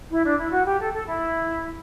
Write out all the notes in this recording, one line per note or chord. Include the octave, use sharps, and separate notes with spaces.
E4
D4
E4
F#4
G4
A4
A4
E4